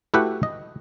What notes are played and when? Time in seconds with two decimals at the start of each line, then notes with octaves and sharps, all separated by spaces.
0.14 A3 E4 F#4 G4 B4 F#5
0.43 D#5